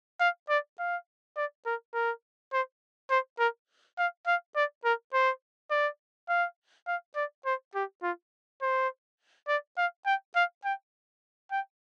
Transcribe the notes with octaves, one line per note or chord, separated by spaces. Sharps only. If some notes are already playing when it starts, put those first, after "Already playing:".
F5
D5
F5
D5
A#4
A#4
C5
C5
A#4
F5
F5
D5
A#4
C5
D5
F5
F5
D5
C5
G4
F4
C5
D5
F5
G5
F5
G5
G5